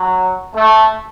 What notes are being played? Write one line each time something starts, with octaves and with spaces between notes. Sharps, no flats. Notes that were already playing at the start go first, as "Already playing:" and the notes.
Already playing: F#3
A3